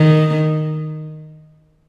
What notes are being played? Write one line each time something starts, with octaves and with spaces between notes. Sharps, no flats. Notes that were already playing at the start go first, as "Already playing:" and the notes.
Already playing: D#3